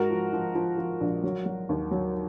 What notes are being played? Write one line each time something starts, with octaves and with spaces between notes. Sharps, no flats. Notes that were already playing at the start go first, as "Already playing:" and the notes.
Already playing: G#2 F#4 A#4
F3
F3
F3
F3
A#1
F#3
F#3
D#2
F#3